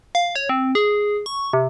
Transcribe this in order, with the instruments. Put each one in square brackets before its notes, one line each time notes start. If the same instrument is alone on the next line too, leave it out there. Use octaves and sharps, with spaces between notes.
[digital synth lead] F5
C#5
C4
G#4
C#6
C3